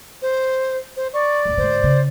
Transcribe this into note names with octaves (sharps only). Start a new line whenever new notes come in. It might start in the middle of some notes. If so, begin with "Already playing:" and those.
C5
C5
D5 C#6
A1 E2
G#2 D3 C5
C#3